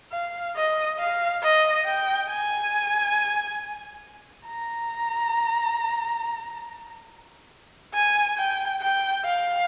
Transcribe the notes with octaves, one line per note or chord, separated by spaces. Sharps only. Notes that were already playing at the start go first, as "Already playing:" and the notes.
F5
D#5
F5
D#5
G5
G#5
A#5
G#5
G5
G5
F5